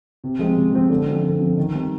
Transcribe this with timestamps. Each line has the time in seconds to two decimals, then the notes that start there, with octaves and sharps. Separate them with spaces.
0.24 C3
0.39 F3 G#3 C4
0.57 C3
0.73 F3 G#3 C4
0.90 D3
1.07 F3 C4
1.23 D3
1.40 F3 C4
1.58 D#3
1.74 G3 C4 D#4